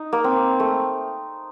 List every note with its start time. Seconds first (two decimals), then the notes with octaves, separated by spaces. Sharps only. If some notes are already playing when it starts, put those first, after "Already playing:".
Already playing: D#4
0.13 A#3
0.24 C4
0.60 A3